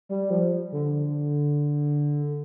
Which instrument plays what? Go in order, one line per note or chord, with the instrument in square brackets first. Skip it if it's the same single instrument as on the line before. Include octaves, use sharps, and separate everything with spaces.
[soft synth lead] G3
F3
D3